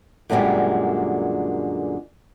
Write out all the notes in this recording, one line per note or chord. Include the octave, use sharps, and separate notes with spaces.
F#2 A#2 D3 D#3 G3 G#3